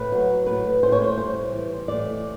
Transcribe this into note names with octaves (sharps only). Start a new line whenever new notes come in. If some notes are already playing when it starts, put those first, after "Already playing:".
Already playing: A2 B4
F#3
A2 B4
A2 C5
C#5
C5
G3 C5
E3
A2 D5